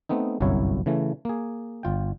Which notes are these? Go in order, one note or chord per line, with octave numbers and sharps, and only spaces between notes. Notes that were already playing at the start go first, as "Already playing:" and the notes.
A3 B3 C4 D#4
G1 C2 F#2 F#3 E4 C#5
C#3 E3 A3
A#3 G#4
G1 F4 G5